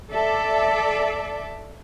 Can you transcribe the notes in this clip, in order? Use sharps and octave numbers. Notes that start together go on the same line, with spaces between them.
A4 D5 E5